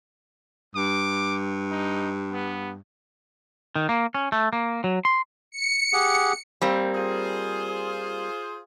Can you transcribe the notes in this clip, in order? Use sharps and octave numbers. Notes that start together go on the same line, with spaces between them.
G2 D6
D#4
B3
D#3
A#3
C#4
A3
A#3
F#3
C6
C#7
G4 G#4 F#5
G3 A#3 C4
F4 G#4 C5